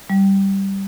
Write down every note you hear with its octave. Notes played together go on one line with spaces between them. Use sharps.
G3